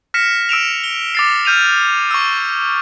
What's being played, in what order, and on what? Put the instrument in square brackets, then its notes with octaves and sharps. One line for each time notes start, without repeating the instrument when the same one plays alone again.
[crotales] F6 A#6 B6 C#7 E7
E6 D7 E7 F7
G7
D6 A6 C7
F6 G6 D#7 F7
C#6 E6